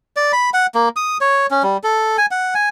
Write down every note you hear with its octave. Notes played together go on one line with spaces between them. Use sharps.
D5
B5
F#5
A#3
D#6
C#5
C#4
G3
A4
G#5
F#5
G#5